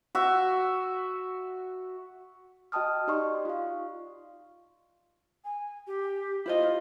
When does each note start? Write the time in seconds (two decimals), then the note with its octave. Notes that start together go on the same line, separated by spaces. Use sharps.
0.15 F#4 E5
2.72 F#4 D#5 G5 A5 D#6 F6
3.08 D#4 G4 D5 D#5 C6 C#6
3.45 F4 F5
5.44 G#5
5.87 G4
6.46 E4 F4 C5 D#5